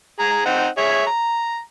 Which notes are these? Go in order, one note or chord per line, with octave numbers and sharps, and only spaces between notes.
G#4 A#5
C4 D#4 F#5
G#4 C#5 E5
A#5